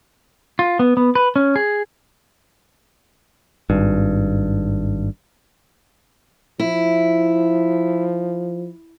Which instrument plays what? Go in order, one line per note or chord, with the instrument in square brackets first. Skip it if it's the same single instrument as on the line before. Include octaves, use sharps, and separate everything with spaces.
[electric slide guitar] F4
B3
B3
B4
C#4
G#4
[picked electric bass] G#1 G2
[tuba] F3 [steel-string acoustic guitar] E4